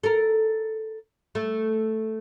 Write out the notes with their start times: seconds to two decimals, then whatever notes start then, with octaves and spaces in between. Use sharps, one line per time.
0.03 A4 A#4
1.35 A3